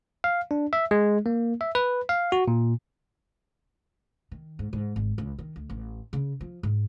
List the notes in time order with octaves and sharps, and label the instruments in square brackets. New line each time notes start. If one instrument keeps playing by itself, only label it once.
[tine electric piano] F5
D4
E5
G#3
A#3
E5
B4
F5
F#4
A#2
[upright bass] D#3
G#2
G#2
G#1
C#2
D#3
D2
A1
C#3
F3
G#2